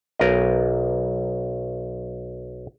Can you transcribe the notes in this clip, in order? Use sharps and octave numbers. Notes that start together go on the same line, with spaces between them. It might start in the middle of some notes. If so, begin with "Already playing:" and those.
B1 A#4 D#5